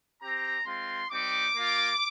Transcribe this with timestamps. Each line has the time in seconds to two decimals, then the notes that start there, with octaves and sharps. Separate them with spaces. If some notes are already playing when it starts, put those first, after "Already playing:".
0.22 C4 G4 A#5
0.65 G#3 C4 F4 C6
1.10 G3 C4 D#4 D6
1.54 A#3 F4